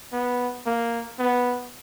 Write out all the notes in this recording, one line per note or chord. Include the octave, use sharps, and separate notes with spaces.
B3
A#3
B3